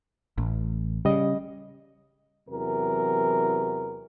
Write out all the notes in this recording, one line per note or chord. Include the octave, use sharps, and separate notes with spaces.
A1
C#3 G3 D#5
E2 C3 E3 F#3 A#4